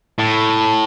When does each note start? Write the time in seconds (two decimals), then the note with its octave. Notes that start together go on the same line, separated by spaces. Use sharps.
0.19 A2